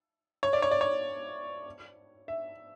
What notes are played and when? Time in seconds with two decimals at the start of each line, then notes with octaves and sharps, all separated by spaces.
0.43 C#5
0.53 D5
0.62 C#5
0.71 D5
0.81 C#5
2.28 E5